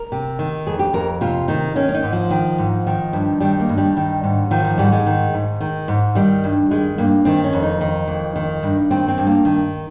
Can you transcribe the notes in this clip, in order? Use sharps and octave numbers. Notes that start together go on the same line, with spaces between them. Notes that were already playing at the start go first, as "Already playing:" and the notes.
Already playing: A#4
C3
D#3
F2 G#4
G4
F2 A#4
C3 F4
D#3 D#4
D#3 C#4
C#4
D#4
G#2
F3
D#3
G#2
D#3
G2
D#3 G3
A#3
G2
G3
D#3
G#2
D#3 F3
F3
G#2 G3
G#3
D#3
G#2
D#3
G#2
D#3 G3
G2
D#3 G#3
G2 A#3
D#3 C4
C#4
F2
D#4
D#3
F2
D#3
G2
D#3 C4
C4
G2
A#3
D#3